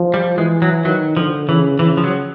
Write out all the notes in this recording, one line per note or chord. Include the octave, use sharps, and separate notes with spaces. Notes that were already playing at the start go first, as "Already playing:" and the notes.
Already playing: F3
G3
E3 G#3
F#3
D#3 F#3
D3 F3
C#3 E3
C#3 E3
F3
F#3